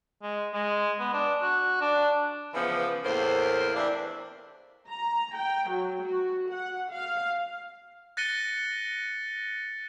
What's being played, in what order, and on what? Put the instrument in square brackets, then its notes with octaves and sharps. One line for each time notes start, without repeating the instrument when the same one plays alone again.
[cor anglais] G#3
G#3
B3
D4
F#4
D4
[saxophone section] C#3 E3 F3 B3
E2 A2 A#3 C5
C3 E3 D4 E4
[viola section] A#5
G5
F#3
F#4
F#5
F5
[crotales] F#6 A6 A#6 C#7 D#7 G7